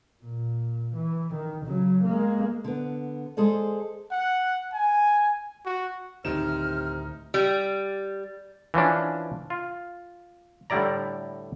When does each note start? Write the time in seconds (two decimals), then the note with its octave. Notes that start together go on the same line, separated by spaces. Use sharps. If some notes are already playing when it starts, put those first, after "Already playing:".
0.23 A#2
0.95 E3
1.34 D#3
1.66 C#3 F#3
2.04 G#3 A#3
2.64 D3 B3
3.37 G#3 G#4 A4 C5 D5
4.12 F#5
4.74 G#5
5.66 F#4
6.25 D2 A2 C3 D#3 D#4 F6 E7
7.34 G3
8.74 E3 F3 C#4 D4
9.50 F4
10.70 A2 D3 G3 E4 D5 A#5